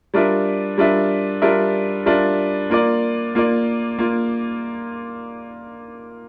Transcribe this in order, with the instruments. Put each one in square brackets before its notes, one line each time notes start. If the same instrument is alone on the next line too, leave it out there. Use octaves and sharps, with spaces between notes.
[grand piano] G3 D4 F4 A#4 E5
G3 D4 F4 A#4 E5
G3 D4 F4 A#4 E5
G3 D4 F4 A#4 E5
A#3 F4 A#4 D5
A#3 F4 A#4 D5
A#3 F4